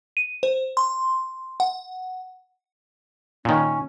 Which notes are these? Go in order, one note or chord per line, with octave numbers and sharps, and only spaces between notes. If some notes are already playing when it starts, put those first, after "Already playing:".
D#7
C5
C6
F#5
A#2 D#3 C#4